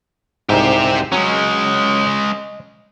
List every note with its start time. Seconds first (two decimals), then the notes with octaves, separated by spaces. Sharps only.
0.49 C2 G#2 G4 E5
1.12 F#3 G#3 C#4
2.07 D#5